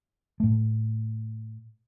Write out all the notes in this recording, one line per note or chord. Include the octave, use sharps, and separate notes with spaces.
A2 A3